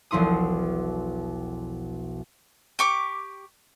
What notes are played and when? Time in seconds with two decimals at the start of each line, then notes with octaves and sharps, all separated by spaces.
0.11 E1 B1 F3 E4 C6 D#6
2.79 G4 C#6 D6